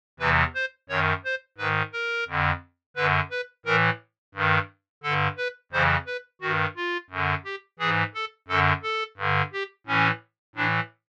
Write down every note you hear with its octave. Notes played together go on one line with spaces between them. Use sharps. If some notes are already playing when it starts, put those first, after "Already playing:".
E2 C3 E3 B4
C5
F#2 D#3 C#5
C5
G#2 D#3 B4
A#4
F2 D3
F#2 D3 B4
B4
A2 E3 A#4
G2 D#3
G2 D3 A4
B4
F2 C#3 E3 C5
B4
G2 D#3 F#4
F4
F#2 D3
G4
G#2 E3 G#4
A4
F#2 D3 A4
A4
G2 D3
G4
A2 E3 C#4
A2 E3 D4